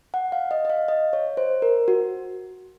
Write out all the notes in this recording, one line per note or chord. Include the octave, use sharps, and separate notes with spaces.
F#5
F5
D#5
D#5
F5
D#5
C#5
C5
A#4
F#4